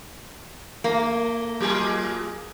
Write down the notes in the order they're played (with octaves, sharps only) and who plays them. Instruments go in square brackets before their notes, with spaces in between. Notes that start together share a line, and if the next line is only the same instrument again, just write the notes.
[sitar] A3 [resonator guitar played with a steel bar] A#3
[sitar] F#3 F4 G#4